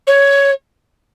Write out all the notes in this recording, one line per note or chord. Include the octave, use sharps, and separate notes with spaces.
C#5